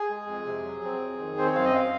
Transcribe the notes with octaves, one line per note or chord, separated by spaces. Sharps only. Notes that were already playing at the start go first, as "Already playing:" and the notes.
Already playing: G#4
G#3
F2
C3
F#3
C4
F2
D#3
C4 C5
C#5
F#2 F5
D#5
F5